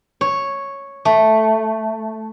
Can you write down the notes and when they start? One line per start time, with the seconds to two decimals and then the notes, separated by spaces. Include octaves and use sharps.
0.21 C#5
1.05 A3